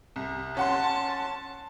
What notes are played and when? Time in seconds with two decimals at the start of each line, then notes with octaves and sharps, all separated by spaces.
0.16 C2
0.57 C#4 F#5 A5 C6